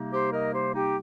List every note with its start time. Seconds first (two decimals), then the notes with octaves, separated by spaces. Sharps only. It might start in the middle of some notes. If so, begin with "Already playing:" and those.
Already playing: C3 G3 A#3 D#4
0.12 G4 C5
0.33 A#4 D#5
0.54 G4 C5
0.75 D#4 G4